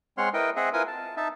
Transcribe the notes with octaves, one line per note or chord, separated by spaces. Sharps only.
G#3 C4 C#5 F#5 C6 F6
E4 A#4 B4 D#5 G5
C4 G#4 D#5 E5 F#5
E4 F4 A#4 B4 G#5 D#6
A5
D#4 E5 A5